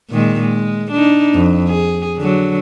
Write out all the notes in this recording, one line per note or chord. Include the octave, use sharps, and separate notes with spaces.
A#2 D#3 G#3
G#3
D4 D#4
F2
G#4
D3 F#3